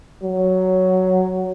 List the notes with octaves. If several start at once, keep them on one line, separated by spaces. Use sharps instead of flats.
F#3